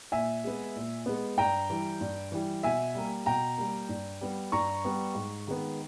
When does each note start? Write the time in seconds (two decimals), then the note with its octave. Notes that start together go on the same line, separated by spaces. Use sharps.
0.12 A#2 E5 G#5
0.44 G#3 B3
0.76 A#2
1.06 G#3 B3
1.38 G2 G5 A#5
1.70 E3 G3
2.01 G2
2.32 E3 G3
2.63 B2 E5 G#5
2.95 G3 A#3
3.26 B2 G5 A#5
3.58 G3 A#3
3.89 G2
4.21 G3 B3
4.52 G2 A#5 C#6
4.85 G3 B3
5.15 G#2
5.47 D#3 G#3 B3